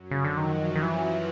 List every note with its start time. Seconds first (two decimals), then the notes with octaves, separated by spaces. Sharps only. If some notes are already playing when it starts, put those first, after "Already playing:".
Already playing: F#2 F#3
0.11 C#3
0.22 D3 F3
0.37 D#3
0.52 E3
0.75 D#3
0.82 E3